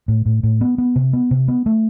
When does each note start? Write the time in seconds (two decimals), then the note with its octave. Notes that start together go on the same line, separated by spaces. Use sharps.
0.08 A2
0.26 A2
0.43 A2
0.61 B3
0.78 B3
0.96 C3
1.13 B3
1.31 C3
1.48 B3
1.66 A3